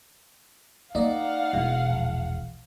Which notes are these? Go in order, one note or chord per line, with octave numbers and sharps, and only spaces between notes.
A#3 D#4 D5 D#5 F5 F#5
E1 E2 B2
A#1